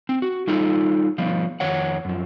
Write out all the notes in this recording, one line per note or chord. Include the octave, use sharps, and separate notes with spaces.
C4
F#4
G3 D#4 F4 A4
F3 G3 B3
F2 D#3 C#5 F#5
F#2 F3